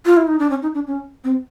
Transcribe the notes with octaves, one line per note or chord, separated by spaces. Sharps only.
F4
E4
D#4
D4
C#4
D#4
D4
C#4
C4